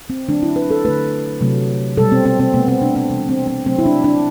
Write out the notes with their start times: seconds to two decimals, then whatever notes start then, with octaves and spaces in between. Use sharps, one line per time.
0.10 C4
0.28 D3 F#3 A3 D4
0.43 E4
0.56 B4
0.71 A4
0.85 D3 A3 B4
1.41 C3 F#3 A3
1.97 B2 G3 A4
2.12 C4
2.26 C4
2.40 C4
2.54 B2 A3 B3
2.68 C4
2.82 D4
2.96 C4
3.10 C3 E3 G3
3.29 C4
3.47 C4
3.66 C3 F#3 A3 C4
3.79 E4
3.86 D4
4.04 D4